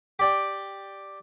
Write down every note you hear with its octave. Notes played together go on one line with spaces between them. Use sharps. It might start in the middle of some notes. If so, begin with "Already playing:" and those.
G4 D5 G5